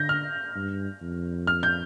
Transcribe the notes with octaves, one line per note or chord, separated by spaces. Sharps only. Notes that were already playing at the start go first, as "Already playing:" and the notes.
Already playing: D3 G6 A#6
F6
G2
F2
F6
G6